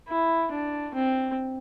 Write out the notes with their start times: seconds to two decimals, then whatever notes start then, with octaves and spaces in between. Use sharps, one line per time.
0.09 E4
0.52 D4
0.94 C4